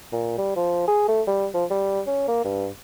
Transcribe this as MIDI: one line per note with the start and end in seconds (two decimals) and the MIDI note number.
0.13 0.37 46
0.38 0.55 55
0.56 0.84 53
0.88 1.08 68
1.08 1.22 57
1.27 1.47 55
1.54 1.64 53
1.71 2.01 55
2.07 2.27 61
2.28 2.44 58
2.45 2.68 43